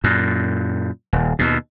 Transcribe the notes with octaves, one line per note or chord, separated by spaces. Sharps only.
F#2 A#2
D#1
D#2 B2